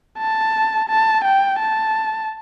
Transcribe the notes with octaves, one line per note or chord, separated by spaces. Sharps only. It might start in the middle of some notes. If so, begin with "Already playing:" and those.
A5
A5
G5
A5